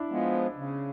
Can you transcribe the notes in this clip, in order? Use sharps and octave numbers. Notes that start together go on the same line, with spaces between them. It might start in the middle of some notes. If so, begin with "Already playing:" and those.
Already playing: D4 E4
F3 G#3 B3
C#3